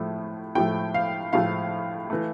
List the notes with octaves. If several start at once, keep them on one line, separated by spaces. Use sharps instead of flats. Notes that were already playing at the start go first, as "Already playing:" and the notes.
Already playing: A2 F3 A3
A2 F3 A3 G5
F5
A2 F3 A3 F5
E3 A3